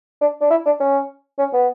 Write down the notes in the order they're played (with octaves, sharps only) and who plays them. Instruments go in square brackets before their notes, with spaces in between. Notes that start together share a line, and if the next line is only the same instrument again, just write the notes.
[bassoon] D4
D4
E4
D4
C#4
C#4
B3